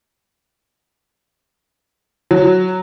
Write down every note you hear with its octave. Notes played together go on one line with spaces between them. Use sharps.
F#3